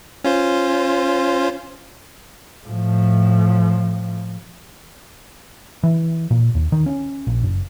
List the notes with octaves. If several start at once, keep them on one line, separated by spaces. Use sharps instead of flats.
C#4 F4 C5
A2 F3
E3
A#2
D#2
D#3
C#4
A#1
F#1